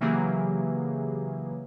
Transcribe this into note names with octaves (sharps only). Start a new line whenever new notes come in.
C#3 E3 F#3 A#3 G4 G#4